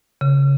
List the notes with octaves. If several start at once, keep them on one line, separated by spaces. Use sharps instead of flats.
C#3